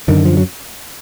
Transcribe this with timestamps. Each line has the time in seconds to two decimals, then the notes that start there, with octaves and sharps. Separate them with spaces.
0.08 F#2 D3 D#3
0.25 F3
0.37 F#3